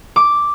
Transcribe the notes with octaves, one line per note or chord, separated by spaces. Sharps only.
D6